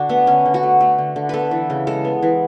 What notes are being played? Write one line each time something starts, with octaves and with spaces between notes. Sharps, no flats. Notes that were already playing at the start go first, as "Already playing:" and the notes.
Already playing: D3 D4 F#4
A3 B3
D3 C#4
D3
F#4
A3
A3
D3
D3
B3 A4 B4
E3
C#3
G#3 A4
B3
E3